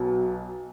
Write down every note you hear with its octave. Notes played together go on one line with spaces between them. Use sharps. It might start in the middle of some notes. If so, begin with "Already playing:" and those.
Already playing: B1 B2 F#3